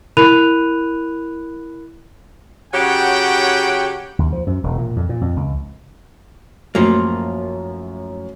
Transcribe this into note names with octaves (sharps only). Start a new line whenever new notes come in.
E4 A#4 B5 F#6 D#7 F7
C#3 F#3 G4 F#5 G5
D#2
F3
F#2
E1
A#2
F2
A#2
F2
C#2
F#2 A2 F3 A#3